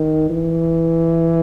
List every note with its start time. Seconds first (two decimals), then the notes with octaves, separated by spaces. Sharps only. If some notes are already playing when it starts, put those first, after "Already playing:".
Already playing: D#3
0.29 E3